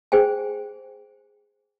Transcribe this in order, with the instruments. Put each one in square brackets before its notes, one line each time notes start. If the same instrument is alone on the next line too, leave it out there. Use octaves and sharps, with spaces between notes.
[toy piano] G#4 C5 G5 G#5